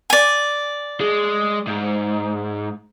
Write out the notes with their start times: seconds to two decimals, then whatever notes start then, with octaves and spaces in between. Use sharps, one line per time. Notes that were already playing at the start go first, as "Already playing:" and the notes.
0.10 D5 G#5
1.00 G#3
1.67 G#2